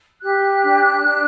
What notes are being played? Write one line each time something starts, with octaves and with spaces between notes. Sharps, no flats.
G4 F#6
D4
D4